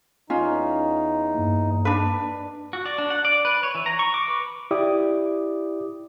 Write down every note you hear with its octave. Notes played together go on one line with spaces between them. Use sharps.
E2 C#4 D#4 F4
G2 A#3
D4 B4
F#4
D5
D4
F#5
D5
B4
C#5
E3
A#5
C#6
D6
B4
E4 G4 D5 D6 D#6